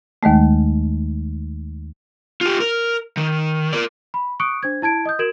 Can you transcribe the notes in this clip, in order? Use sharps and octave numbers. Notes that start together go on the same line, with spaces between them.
D#2 D#3 G#3 A3
F4 G4
A#4
D#3
A#4 D5
B5
C#6 D#6 F#6 C#7 D7
D4 C5 G#6
E4 A5 G#6 D7
D#5 D#6 G6
F#4 A#4 G#6 D7 E7 F#7